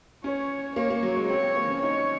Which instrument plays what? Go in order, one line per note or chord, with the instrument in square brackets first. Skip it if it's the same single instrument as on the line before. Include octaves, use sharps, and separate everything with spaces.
[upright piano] C#4 [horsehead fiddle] C#5
[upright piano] A#3 [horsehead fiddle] C#5
[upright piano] A#3
F#3
G#3
[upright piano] C4 [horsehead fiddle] C#5
[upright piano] C4
A#3
C#4
[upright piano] D#4 [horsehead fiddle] C#5